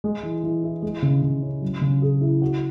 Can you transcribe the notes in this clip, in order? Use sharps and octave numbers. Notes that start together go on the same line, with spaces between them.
G#3
E3
E3
E4
G#3
C#3
C#3
C#4
F#3
C#3
G#4
E4
F#4